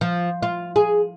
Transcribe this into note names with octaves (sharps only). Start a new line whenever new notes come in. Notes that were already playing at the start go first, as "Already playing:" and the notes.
F3
F4
G#4